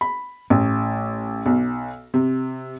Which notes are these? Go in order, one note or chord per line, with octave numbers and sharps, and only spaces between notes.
B5
A1
B1
C3